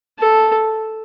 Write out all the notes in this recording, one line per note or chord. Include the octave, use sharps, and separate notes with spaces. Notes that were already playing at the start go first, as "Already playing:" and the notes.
A4